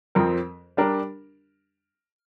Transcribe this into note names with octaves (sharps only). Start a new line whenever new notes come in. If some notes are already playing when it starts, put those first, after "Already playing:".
F2 F3 C4 A#4
G3 D4 A#4